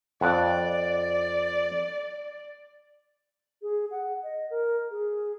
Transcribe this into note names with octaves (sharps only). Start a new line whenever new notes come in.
F2 D5 F#5
G#4
F#5
D#5
A#4
G#4